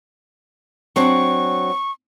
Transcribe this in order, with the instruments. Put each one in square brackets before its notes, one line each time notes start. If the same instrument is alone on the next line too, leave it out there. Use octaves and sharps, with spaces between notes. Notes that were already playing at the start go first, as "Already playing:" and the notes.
[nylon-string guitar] F#3 C4 D4 [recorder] C#6